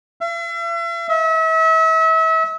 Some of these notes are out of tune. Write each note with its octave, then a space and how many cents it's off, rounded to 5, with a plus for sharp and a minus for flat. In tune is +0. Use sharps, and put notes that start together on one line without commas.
E5 +45
E5 -35